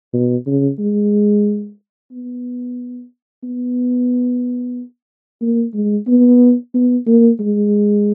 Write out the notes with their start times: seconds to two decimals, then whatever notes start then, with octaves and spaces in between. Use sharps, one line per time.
0.13 B2
0.46 C#3
0.79 G#3
2.12 B3
3.44 B3
5.42 A#3
5.74 G#3
6.08 B3
6.74 B3
7.07 A#3
7.40 G#3